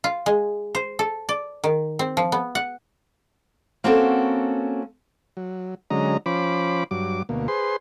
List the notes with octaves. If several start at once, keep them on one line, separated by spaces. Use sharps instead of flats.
F4
G#3
C5
A4
D5
D#3
C4
F3
B3
F#5
A#3 C4 C#4 F#4 A4 A#4
F#3
D3 F#3 G#3 C#4 D#5 A#5
F3 C#4 C5 B5 D6
G2 F#3 D6
D2 B2 A#3
G#4 B4 C5 C6